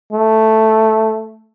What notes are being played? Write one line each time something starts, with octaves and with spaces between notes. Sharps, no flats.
A3